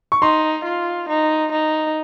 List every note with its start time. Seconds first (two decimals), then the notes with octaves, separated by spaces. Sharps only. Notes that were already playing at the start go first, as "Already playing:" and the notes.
0.12 C#6
0.22 D#4 C6
0.65 F4
1.09 D#4
1.52 D#4